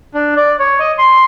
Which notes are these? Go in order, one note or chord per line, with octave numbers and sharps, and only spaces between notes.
D4
D5
C#5
D#5
C6